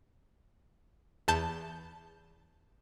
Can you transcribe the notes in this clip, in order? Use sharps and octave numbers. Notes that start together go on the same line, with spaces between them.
E2 A5 G6